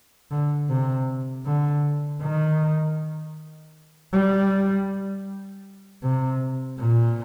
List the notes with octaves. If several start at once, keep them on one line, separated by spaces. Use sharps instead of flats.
D3
C3
D3
D#3
G3
C3
A#2